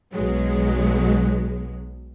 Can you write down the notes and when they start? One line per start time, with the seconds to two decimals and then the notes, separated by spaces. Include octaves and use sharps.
0.13 B1 B2 F#3 G#3